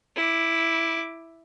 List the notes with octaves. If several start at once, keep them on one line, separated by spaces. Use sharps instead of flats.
E4 D6